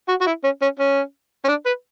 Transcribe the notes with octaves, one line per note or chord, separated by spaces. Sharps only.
F#4
F#4
E4
C#4
C#4
C#4
C#4
D4
B4